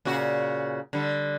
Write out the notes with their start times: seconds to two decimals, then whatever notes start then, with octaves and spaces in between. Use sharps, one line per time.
0.05 A#2 C#3 F#4
0.93 D3 G3